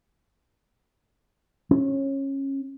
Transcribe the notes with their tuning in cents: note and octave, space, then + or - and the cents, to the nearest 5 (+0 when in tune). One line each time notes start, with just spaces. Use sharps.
C#4 -20